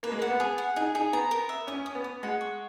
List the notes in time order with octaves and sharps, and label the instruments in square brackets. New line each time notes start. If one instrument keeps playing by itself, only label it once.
[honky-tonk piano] A#3 [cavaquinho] B4
[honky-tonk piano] G#3
[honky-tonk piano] A#3 [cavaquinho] F#5
[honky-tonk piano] B3
[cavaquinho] G#4
F#5
[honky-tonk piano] D#4 [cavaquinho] G#4
[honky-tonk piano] D#4 [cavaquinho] G#4
[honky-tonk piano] B3 [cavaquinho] A#5
[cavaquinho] A#4
E5
[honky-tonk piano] C#4 [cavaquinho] D#6
[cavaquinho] D#6
[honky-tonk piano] B3
[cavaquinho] D#6
[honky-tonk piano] G#3 [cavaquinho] F#5
[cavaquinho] C#6